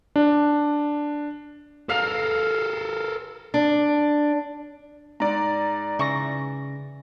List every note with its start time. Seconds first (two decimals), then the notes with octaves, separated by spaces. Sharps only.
0.16 D4
1.89 A4 A#4 F5
3.54 D4
5.20 G#2 D5 A#5
5.99 C#3 E3 C#6 A#6